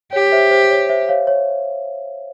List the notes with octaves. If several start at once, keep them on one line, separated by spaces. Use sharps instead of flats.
G4 C#5
C5 E5
C5
C#5
C5 E5
C#5 F5
C#5